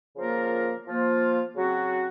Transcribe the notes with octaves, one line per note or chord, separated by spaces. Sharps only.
C#3 F3 A#3 F4 A#4
F3 A#3 F4
C#3 F#3 C4 F#4